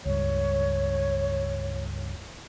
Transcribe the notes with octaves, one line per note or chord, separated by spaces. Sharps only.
C#2 G2 C#5